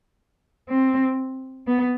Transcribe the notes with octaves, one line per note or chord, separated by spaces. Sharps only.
C4
B3